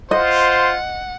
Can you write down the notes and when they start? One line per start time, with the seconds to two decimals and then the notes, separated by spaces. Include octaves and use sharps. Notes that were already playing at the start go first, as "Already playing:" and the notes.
0.11 F4 C5 D#5 F#5